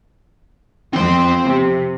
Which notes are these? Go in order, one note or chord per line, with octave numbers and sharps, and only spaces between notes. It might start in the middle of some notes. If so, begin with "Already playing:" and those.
F2 C4 C6
C3